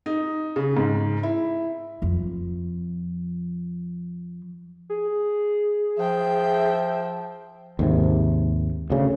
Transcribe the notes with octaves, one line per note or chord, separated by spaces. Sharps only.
D#4
C#3
G#2
E4
F2 F3
G#4
F3 E5 G5
D#2 G#2 C3
D2 C#3